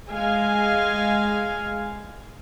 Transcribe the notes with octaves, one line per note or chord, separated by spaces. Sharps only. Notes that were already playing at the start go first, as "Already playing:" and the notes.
G#3 F5 G#5